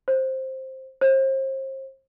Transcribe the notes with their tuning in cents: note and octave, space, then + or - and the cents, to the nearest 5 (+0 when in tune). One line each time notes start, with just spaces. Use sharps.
C5 +10
C5 +35